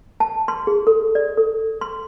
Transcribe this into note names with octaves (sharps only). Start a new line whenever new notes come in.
A5
C6
G#4
A4
D5
A4
C6